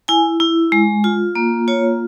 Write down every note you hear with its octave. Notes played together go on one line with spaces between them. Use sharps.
E4 G#5
E4
G#3
F4
A#3
F4 C#5